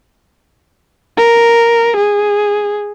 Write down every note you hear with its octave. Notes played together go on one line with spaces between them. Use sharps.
A#4
G#4